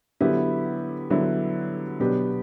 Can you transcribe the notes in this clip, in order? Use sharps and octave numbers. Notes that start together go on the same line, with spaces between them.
D3 F#3 B3 E4 G4
D3 F#3 B3 E4
B2 F#3 B3 D4 G4